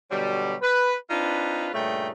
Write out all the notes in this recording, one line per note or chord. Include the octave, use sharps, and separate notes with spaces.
B2 D3 F#3 G3
B4
C4 D4 D#4 F4 B4
G2 A#2 C#3 A3 D#4 G5